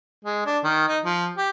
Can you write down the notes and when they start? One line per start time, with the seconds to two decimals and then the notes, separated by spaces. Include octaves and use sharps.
0.25 G#3
0.46 D4
0.64 D#3
0.88 D#4
1.04 F3
1.37 G4